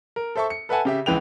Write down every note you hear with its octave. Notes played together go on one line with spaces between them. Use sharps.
A#4
A4 C5 E5 A5 C#6
C#7
A4 B4 E5 F#5 G#5 A5
C#3 G4 E5
C#2 E3 B4 G5 F7